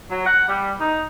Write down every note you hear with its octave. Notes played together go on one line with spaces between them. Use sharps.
F#3
F#5
G3
D#4